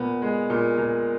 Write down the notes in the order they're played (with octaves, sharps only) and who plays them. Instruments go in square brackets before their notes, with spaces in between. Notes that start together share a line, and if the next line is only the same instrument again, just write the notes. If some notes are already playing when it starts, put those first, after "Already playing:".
Already playing: [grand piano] A#2 B3
G#3
A#2
A#2